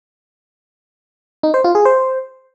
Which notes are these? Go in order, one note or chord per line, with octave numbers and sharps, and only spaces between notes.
D#4
C5
F4
G#4
C5